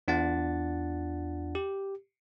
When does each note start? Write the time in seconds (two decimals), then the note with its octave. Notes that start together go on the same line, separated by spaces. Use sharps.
0.08 E2 D4 F4 F#5 A6
1.55 G4